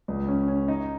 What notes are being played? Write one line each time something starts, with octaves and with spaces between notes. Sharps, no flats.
C#2
C#4
C#4
D#4